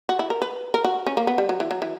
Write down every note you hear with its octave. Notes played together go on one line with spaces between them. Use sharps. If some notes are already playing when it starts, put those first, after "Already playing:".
F#4
E4
A#4
B4
A#4
F#4
C#4
A#3
B3
G3
F#3
E3
F#3
E3